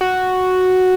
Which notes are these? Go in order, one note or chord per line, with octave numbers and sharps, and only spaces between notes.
F#4